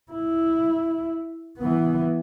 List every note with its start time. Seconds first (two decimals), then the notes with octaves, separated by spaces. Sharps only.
0.12 E4
1.58 E3 B3